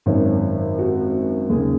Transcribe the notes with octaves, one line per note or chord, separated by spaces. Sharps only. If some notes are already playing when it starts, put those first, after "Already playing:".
G#1 F#2 D#3 C#5
F#4
D#2 C#3 G#4